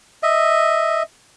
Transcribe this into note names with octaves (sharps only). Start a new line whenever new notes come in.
D#5 E5